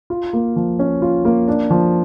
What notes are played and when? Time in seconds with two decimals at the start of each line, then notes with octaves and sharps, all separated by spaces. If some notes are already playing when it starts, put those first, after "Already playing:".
0.10 F4
0.33 A#3
0.56 F3
0.79 C#4
1.02 F4
1.25 A#3
1.48 D4
1.70 F3